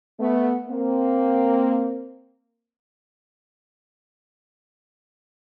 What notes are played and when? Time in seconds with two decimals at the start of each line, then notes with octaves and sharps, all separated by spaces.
0.20 A3 B3
0.69 A#3 C4